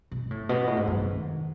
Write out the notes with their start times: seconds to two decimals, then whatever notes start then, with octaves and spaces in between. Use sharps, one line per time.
0.11 B2
0.31 A2
0.49 B2
0.67 A2
0.77 G#2
0.87 F#2
0.96 G#2
1.05 D#3